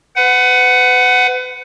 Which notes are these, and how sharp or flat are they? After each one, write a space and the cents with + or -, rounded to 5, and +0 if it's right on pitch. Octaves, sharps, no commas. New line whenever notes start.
B4 +35 F#5 +0